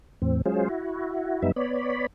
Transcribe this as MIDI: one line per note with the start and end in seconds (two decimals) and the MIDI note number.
0.22 0.42 40
0.22 0.42 45
0.22 0.42 60
0.46 0.68 54
0.46 0.68 56
0.46 0.68 61
0.46 0.68 65
0.46 0.68 68
0.46 0.68 72
0.69 1.42 64
0.69 1.42 66
1.42 1.52 42
1.42 1.52 55
1.42 1.52 59
1.42 1.52 63
1.42 1.52 76
1.56 2.07 59
1.56 2.07 73
1.56 2.07 74
1.56 2.07 83